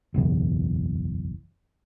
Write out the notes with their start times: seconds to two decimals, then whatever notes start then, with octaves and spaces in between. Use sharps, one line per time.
0.14 F#1 B1 E2